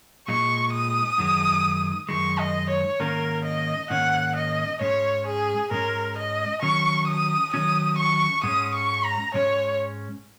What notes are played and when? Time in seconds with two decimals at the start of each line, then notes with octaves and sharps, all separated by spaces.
0.28 A#2 G#3 D#4 C#6
0.73 D#6
1.18 F#2 D#3 G#3
2.09 F#2 D#3 G#3 C#6
2.39 D#5
2.70 C#5
3.00 G#2 D#3 A#3 C#4 A#4
3.45 D#5
3.90 G#2 D#3 A#3 C#4 F#5
4.36 D#5
4.81 G#2 G#3 C#4 C#5
5.26 G#4
5.71 G#2 G#3 C#4 A#4
6.17 D#5
6.62 D#3 F#3 C#4 C#6
7.08 D#6
7.53 D#3 F#3 C#4 D#6
7.99 C#6
8.43 G#2 G#3 C#4 D#6
8.74 C#6
9.04 A#5
9.34 G#2 G#3 C#4 C#5